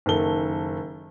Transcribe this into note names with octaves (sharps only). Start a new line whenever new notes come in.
F#1 D#3 A4 G7